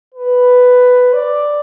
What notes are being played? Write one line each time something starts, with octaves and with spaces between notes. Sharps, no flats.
B4
D5